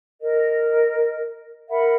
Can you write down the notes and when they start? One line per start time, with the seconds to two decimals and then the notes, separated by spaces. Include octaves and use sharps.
0.21 A#4 D#5
1.69 A#4 E5 F#5 B5